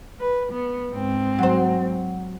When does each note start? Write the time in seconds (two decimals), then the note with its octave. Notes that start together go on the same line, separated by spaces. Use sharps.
0.20 B4
0.52 B3
0.92 G#2 C4
1.39 F#3 C5